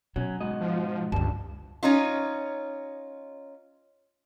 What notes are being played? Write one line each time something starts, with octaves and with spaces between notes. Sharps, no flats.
B2 F#3 C#4
G#2 F#4 D#5
F3
C#2 G2 D3 A5
C#4 D#4 F4